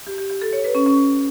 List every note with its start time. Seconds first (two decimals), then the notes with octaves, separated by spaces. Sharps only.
0.07 G4
0.18 G4
0.30 G4
0.41 A4
0.53 C#5
0.64 B4
0.75 C#4
0.86 C#4